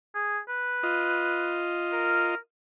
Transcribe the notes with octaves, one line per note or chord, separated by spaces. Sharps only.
G#4
B4
F4 D#5
A#4